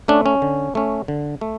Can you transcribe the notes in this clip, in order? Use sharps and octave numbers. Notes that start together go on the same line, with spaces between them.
A3 C#4 D4
C#4
D3
A3 C#4
D3
A3